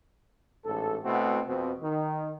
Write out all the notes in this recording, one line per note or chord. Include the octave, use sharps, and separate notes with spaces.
A1 G#2 A4
B2 A3 C4 E4 F#4
F2 B2 C4
D#3